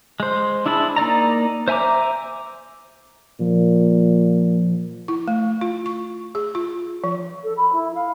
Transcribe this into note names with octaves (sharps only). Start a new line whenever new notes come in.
G#3 C5
D4 E4 G#4 A5 B5
A#3 D#4 D5 A#5
C5 E5 G#5 A#5 D6
A#2 F3
E4
A3
F4
C#6
G#4
F4
F3
A4
B5
E4
F5